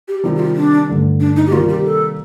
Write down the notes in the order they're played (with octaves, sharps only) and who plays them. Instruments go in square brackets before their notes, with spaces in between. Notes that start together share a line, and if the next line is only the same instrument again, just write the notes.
[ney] G4
[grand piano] C3 D#3 G3 [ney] F4
[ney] G4
F4
D4
[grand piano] G2 D3 A3
[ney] D4
D#4
G4
[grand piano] C3 D#3 G3 A#3 [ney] F4
[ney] G4
A4